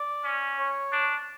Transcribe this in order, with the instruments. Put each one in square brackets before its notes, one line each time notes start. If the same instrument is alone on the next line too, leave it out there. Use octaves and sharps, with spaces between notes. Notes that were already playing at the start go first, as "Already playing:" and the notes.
Already playing: [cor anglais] D5
[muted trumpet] C#4
[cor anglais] C#5
[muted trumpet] D4